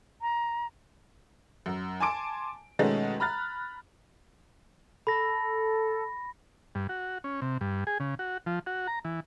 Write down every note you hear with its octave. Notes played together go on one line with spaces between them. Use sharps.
A#5
F#2
G#5 A5 C6 D6 D7
B2 D#3 G#3 A3 C#4 D#4
A#5 B5 F6 F#6 A6
A4 B5 A#6
G2
F#4
C#4
C3
G2
G#4
C#3
F#4
F3
F#4
A#5
E3